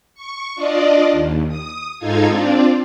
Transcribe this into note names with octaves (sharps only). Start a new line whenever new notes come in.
C#6
D4 F4 D5 D#5
D#2
D#6
G#2 D#4 F4 A4 F5 G#6
C4 D4 F4 D5